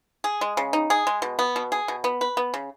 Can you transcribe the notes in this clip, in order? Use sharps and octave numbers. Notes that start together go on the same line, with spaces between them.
G#4
G#3
C#3
D#4
G#4
G#3
B2
B3
B2
G#4
B2
B3
B4
B3
C#3